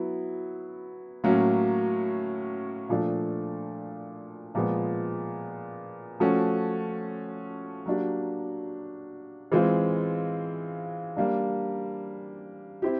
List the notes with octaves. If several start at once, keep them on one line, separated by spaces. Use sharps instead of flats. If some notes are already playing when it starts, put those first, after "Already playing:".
Already playing: F#3 B3 E4
A2 F#3 A#3 C#4
A#2 F3 A3 D4
A#2 F3 G#3 B3
F3 A3 C#4 F#4
F#3 A#3 D4 G4
E3 G#3 C4 F4
G3 A#3 D4
C4 E4 G4